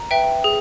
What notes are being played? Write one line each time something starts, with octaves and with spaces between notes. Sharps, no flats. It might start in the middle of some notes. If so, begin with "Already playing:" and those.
Already playing: A#5
B4 E5 G5
G#4